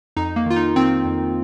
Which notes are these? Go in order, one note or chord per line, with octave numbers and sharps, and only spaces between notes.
F2 D#4
A#3
D#3 F4
D#4
D#3 C4
F2